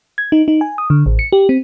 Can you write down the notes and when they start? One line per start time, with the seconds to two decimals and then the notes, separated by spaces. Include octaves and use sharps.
0.18 G#6
0.32 D#4
0.48 D#4
0.61 G#5
0.78 D#6
0.90 D3
1.06 A1
1.19 C#7
1.32 G4
1.49 C4